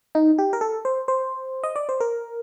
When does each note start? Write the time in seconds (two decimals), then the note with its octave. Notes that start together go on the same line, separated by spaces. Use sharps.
0.15 D#4
0.38 G4
0.53 A#4
0.61 A4
0.85 C5
1.08 C5
1.63 D#5
1.76 D5
1.89 C5
2.00 A#4